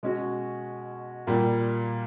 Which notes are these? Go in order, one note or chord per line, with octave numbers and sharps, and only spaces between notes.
B2 G#3 C#4 F#4
A#2 G3 A#3